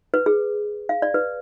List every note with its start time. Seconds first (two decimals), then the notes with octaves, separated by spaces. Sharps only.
0.14 B4
0.26 G#4
0.89 F5
1.02 D5
1.14 B4